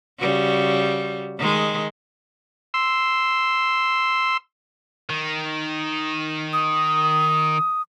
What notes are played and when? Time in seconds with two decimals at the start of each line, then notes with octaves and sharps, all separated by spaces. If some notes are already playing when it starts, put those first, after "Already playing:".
0.19 C#3 G3 F#4
1.38 D#3 G#3
2.74 C6 E6
5.10 D#3
6.53 D#6